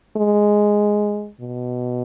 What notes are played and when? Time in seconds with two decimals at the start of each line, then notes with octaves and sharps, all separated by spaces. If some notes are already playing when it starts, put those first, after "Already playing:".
0.17 G#3
1.41 B2